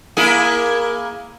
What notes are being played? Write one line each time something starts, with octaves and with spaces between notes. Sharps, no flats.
A#3 E4 G#4